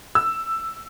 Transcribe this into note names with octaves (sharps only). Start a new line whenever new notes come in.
E6